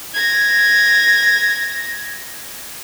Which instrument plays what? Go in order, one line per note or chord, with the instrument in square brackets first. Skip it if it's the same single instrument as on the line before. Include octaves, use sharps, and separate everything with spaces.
[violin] G#6 A#6